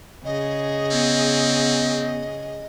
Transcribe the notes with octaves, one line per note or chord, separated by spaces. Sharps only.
C#3 G#4 D#5
B3 C4